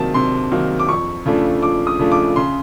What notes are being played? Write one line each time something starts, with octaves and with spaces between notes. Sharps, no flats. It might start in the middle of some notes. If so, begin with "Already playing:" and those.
Already playing: C3 D#3 F#3 A#3 A5
C3 C6
D#3 F#3 A#3
D6
F2 C#6
C#3 F3 A3 D4
F2 D6
D#6
C#3 F3 A3 D4
D6
C#3 C6